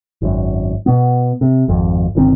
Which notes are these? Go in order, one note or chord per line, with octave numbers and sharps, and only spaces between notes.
G#1 F#2
B2 B3
C3
G#1 F2
G1 C2 D#3 C4